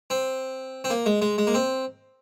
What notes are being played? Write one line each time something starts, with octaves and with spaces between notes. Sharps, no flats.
C4
C4
A#3
G#3
G#3
G#3
A#3
C4